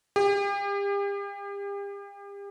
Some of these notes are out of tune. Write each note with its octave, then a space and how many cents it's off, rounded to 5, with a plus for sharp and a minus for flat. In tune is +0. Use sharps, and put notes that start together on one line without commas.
G4 +40